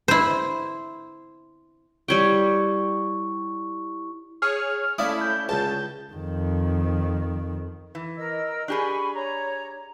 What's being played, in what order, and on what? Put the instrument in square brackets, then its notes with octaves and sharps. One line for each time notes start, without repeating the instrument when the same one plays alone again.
[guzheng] E4 C5
[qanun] G3 C#5 G5 [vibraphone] E4 C#6
[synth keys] G#4 C#5 [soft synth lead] F6
[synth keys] A3 C#4 E4 [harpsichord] D5 F5 D#6
[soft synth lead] G6
[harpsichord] C#2 [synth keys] C#3 A5
[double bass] F2 D#3
[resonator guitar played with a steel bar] E3
[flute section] A#4 D#5 E6
[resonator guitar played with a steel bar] D4 G4 G#4 [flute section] G#5 B5 C#6
[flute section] C#5 A#5